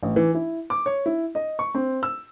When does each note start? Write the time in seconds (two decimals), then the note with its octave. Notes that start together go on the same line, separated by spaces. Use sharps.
0.03 A1
0.16 E3
0.35 E4
0.70 D6
0.86 C#5
1.06 E4
1.35 D#5
1.59 C#6
1.75 C4
2.03 E6